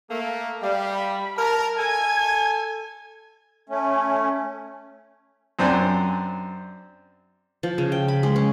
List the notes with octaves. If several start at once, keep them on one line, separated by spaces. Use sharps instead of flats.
A3 A#3
G3 F5
B5
A#4 A5
A4 G#5 G#6
A3 C#4
F#2 C4 D4 C5 G#5
F3
C#3
G5
B5
G#3
C#4